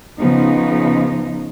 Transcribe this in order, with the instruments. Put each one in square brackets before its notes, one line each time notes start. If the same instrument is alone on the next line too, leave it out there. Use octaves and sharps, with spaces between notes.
[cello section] C#3 F3 B3 D#4